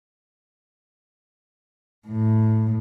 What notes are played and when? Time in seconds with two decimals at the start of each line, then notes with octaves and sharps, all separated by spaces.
2.08 A2